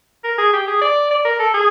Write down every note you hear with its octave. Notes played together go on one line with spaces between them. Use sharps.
A#4
G#4
G4
G#4
D5
D5
A#4
A4
G#4